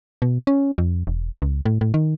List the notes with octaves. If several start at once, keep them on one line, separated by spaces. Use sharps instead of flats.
B2
C#4
F2
E1
C#2
A2
A2
D#3